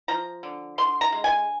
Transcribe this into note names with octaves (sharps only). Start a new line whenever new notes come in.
F3 A#5
D3
D3 C6
A#5
G#3
G#5